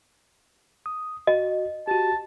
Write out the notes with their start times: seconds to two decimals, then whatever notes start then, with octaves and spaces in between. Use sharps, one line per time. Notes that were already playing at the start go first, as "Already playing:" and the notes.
0.86 D#6
1.27 F#4 D#5
1.88 F#4 G4 A5